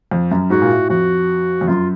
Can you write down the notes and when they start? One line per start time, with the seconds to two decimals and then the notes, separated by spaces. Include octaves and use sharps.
0.11 F2
0.31 F#2
0.50 G#2 F#4
0.62 A#2
0.71 A2
0.89 F2 F#4
1.61 F2
1.68 F#2 F4